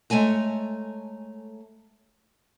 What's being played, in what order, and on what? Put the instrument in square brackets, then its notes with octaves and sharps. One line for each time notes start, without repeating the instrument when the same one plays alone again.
[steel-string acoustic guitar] G#3 A3 C#5 G#5 A#5